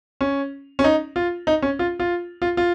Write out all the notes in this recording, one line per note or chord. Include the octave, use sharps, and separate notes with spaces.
C#4
C#4
D#4
F4
D#4
C#4
F4
F4
F4
F4